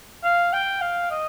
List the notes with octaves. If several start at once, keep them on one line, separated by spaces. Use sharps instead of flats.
F5
G5
F5
D#5